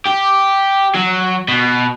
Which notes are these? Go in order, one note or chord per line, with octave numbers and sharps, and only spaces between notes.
G4
F#3
B2